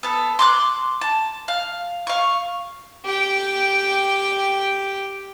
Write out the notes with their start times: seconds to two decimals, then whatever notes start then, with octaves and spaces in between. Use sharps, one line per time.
0.03 B3 A4
0.39 C6 D6 F#6
1.01 A5
1.48 F5
2.07 F5 C#6
3.05 G4 G5